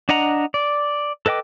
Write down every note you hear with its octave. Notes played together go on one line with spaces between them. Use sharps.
D4 D#5 F#5 A#5
D5
A4 B4 D#5 G5 D6